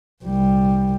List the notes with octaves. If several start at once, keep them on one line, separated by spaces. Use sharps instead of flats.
C2 G3